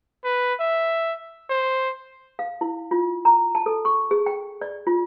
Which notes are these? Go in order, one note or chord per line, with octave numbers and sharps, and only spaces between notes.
B4
E5
C5
F5
E4
F4
A#5
A5
A4
C#6
G#4
G5
D5
F4